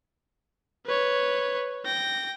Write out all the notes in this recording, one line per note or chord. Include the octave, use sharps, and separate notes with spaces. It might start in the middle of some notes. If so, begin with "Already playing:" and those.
B4 C#5
G5 A#6